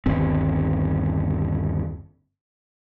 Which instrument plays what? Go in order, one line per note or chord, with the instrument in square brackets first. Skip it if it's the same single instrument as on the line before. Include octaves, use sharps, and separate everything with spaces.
[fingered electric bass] G1 D#2 C4